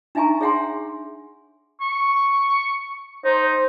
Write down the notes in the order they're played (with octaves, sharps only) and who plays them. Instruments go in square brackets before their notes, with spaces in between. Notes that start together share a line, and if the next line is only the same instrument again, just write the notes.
[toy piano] D4 D#4 E5 G#5 A#5 C#6
G#4 C#5 E5 F#5 G#5 C6
[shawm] C#6
[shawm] D#4 [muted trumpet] C5